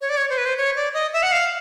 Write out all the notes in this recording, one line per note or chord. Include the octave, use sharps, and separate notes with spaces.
C#5
D5
C#5
C5
B4
C5
C#5
D5
D#5
E5
F#5
F5